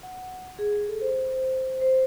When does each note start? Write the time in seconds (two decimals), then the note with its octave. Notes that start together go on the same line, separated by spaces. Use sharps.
0.03 F#5
0.59 G#4
0.89 A4
1.01 C5
1.81 C5